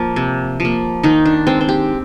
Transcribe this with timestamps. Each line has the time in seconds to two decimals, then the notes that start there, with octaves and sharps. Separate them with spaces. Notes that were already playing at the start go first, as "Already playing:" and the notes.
Already playing: F3 A#3
0.16 C3
0.60 F3 A#3
1.03 D#3 D#4
1.25 D4
1.47 G#3 C4
1.61 C4
1.69 G4